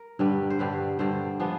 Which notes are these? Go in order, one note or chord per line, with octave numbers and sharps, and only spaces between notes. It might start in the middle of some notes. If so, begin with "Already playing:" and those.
Already playing: A#4
G2 D3 G3 B4
C5
G2 D3 G3 B4
G2 D3 G3 C5
F3 G#3 B3 D4